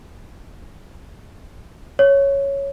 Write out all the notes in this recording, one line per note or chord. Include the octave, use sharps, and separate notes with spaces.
C#5